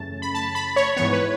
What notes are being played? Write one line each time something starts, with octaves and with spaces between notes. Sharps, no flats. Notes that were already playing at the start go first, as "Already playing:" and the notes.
Already playing: F#2 C#3 E3 A3 C#4 A5
B5
A5
B5
C#5
G#2 E3 B3 C#5
B4